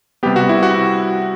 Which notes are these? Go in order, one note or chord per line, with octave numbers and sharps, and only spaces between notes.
C3 G3 B3 G4
F#4
E4
F#4